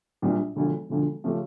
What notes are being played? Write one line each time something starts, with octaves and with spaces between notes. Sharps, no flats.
A#1 A#2 G3 D4
E1 D2 D3 F3
E1 D2 D3 F3
C#3 F3 A3 C#4 G4